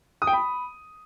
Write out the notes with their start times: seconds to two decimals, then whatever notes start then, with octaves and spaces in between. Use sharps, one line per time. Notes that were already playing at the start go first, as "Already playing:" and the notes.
0.22 D#6
0.27 G5
0.33 B5